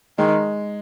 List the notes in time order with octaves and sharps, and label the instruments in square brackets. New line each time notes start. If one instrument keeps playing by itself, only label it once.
[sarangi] D#3 [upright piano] G#3